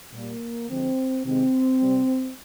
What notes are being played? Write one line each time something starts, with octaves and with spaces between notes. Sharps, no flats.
A#2 G3 A#3
D3 F3 G#3 C4
C3 D#3 G#3 C4
C3 G3